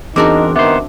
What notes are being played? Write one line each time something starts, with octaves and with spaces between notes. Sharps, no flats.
E2 C4 D4 D#4 F#4 G#4 A#4 D6
D#3 B3 C5 E5 D6